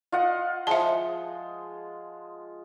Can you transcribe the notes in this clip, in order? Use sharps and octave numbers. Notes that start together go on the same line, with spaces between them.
F4 D#5 F#5
F3 G#3 E5 A5